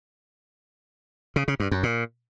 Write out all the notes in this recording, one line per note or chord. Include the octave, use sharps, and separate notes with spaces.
C#3
C#3
G2
F#2
A#2